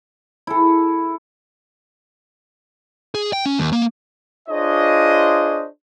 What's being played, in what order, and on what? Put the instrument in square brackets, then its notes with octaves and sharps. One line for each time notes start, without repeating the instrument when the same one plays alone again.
[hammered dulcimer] E4 A4
[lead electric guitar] G#4
G5
C#4
D#2
A#3
[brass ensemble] D4 F4 G#4 C5 C#5 D#5